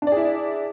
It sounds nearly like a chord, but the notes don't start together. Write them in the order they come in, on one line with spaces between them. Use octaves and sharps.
D4 D5 G#4 E4